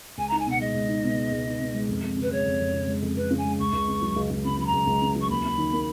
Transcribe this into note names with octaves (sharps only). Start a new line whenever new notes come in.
C#2 G#5
A#5
D#4
G#5
B2 F#5
G#3 D#5
C#2
D#4
B2
G#3
C#2
D#4
B2
G#3
F2
F2
C#3
B4
G#3 C#5
F2
F2
C#3
G#3
F2
F2 B4
C#3
G#5
G#3
C#2 C#6
C#2
C#3
F#3
C#2
C#2
C#3 B5
F#3 B5
A#5
C#2
C#2
C#3
F#3
C#6
D#2 B5
C#4
D#3
A#3